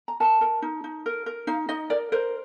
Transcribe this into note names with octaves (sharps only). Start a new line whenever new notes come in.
A#5
A#4 A5
A#4
D#4
D#4
A#4
A#4
D#4 F5
D#4 D#5
A#4 D5
A#4 C5